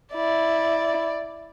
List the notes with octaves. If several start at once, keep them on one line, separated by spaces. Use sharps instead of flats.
E4 D5